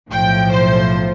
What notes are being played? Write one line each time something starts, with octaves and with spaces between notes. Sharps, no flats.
B1 A2 F3 G5
C5